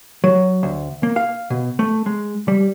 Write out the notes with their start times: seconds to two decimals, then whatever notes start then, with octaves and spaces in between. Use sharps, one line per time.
0.24 F#3
0.63 D2
1.03 A#3
1.16 F5
1.50 B2
1.79 A3
2.06 G#3
2.48 G3